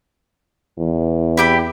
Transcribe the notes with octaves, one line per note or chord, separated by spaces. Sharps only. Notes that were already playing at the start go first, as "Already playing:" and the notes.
E2
E4 G4 B5